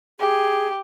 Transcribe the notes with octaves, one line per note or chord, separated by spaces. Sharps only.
G4 G#4